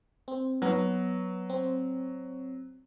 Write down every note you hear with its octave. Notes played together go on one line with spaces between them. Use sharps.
C4
F#3 B3
C4